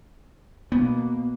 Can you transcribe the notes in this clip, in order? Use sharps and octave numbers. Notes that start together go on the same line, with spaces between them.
B2 A#3 B3